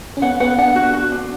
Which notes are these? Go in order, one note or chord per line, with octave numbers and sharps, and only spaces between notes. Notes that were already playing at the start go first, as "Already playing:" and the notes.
C#4
B3 F#5
B3 F#5
D4 F#5
F#4
F#4
D4